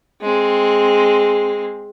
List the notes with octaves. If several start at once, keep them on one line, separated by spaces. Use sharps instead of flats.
G#3 C4